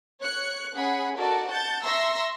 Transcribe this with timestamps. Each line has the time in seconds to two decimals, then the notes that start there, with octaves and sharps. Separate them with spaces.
0.21 C#5 F#6 C#7
0.74 C#4 G#4 F#5 B5
1.17 D#4 F#4 A4 A#4 D5
1.48 F#5 A5 G6 A6
1.84 E5 A#5 C6 C#6 E6 A#6